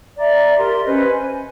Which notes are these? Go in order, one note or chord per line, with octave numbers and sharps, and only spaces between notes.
D5 E5 A#5
G4 A#4 C6
C#4 B4 C5 D#5
G#5